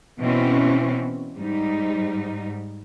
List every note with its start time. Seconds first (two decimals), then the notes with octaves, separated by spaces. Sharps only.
0.18 B2 E3 C4 C#4
1.36 G#2 G3 D#4